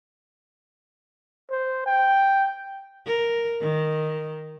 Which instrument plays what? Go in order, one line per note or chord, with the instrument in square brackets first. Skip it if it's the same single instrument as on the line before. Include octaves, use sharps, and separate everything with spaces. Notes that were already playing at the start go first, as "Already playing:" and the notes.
[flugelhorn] C5
G5
[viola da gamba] A#4
D#3